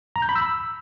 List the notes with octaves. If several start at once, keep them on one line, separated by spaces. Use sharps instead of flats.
A#5
G6
B5
E6